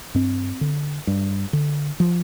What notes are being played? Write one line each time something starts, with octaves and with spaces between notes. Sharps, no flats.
G2 C4
D3
G2
D3
F3